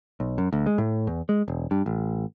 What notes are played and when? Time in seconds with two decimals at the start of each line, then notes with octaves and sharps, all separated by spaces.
0.20 B1
0.38 F#2
0.53 D2
0.66 G#3
0.78 A2
1.07 E2
1.29 G#3
1.48 E1
1.71 G2
1.86 A1